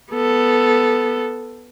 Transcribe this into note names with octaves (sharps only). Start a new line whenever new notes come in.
B3 A4